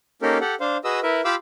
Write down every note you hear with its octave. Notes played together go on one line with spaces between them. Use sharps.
A#3 C#4 D#4 G4 A4 A#4
G4 A4 F#5
D4 C5 F5
F#4 G#4 B4 D#5 D#6 E6
E4 A#4 B4 E5
F4 G4 F5 B5 D6 E6